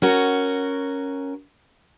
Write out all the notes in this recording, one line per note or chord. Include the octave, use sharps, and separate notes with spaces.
C#4 F#4 A#4